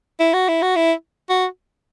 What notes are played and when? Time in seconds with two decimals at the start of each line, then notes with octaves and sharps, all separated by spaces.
0.20 E4
0.34 F#4
0.48 E4
0.62 F#4
0.76 E4
1.30 F#4